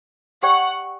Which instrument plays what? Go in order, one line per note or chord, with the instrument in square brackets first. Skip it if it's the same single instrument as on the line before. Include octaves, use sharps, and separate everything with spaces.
[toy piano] G4 D5 G5 C#6 [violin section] F#5